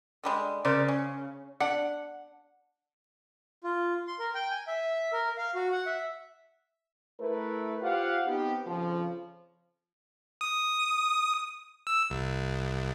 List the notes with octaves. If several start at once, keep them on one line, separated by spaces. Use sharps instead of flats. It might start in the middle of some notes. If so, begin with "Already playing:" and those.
D3 G3 G#3
C#3 A#4 C5 D5
C#4
D4 F#5
F4
C6
A#4
G5
G#5
E5
A#4
F5
F#4
F#5
E5
A3 E4 A#4 B4
F4 G4 C5 F5 F#5
B3 C4 D#4 G4
F2 C#3 F3
D#6
E6
C2